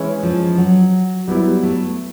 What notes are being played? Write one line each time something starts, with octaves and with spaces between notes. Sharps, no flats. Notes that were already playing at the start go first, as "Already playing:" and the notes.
Already playing: E3 G#3 C#4 E4
F3
F#3
F#3 G3 B3 E4
A3